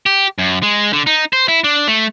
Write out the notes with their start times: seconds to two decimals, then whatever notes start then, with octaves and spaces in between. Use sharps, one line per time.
0.06 G4
0.39 F#2
0.63 G#3
0.93 D3
1.07 D#4
1.33 C5
1.48 E4
1.64 D4
1.88 A3